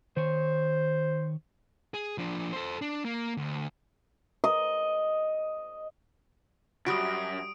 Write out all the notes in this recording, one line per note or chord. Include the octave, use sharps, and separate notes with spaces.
D#3 C5 C#5
G#4
F3 D4
A4 C5
D4
A#3
D2
D#5
F#2 G3 F#4 D#6 D7